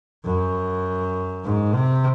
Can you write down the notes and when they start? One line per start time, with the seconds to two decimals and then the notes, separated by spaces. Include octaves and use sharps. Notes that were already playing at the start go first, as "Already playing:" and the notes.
0.25 F#2
1.44 G#2
1.74 C3